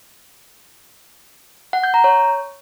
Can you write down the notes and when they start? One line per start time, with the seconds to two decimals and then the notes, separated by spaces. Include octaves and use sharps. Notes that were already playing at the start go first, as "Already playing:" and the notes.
1.73 F#5
1.83 G6
1.94 A#5
2.04 C#5